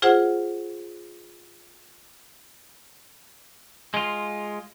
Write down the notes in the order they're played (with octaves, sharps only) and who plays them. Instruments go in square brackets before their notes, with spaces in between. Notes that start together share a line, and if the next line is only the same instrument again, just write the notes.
[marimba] F4 G#4 C5 F#5
[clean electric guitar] G#3 F4